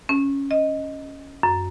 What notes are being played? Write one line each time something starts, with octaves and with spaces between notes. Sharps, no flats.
C#4
D#5
F#2